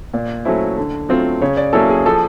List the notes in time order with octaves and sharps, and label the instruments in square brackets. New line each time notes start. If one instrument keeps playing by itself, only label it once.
[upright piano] A#2 [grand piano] D5
[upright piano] F#3 A3 C#4 E4 [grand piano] C5
[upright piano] D3
F#3 A3 C4 F4
[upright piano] C#3 [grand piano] C#5
[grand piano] D5
[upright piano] F#3 A#3 C#4 E4 [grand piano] A4
[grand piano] G#4
[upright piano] F3 [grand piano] A4